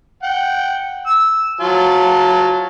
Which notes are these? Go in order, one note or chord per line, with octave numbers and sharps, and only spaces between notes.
F#5 G5
E6
F#3 F4 A5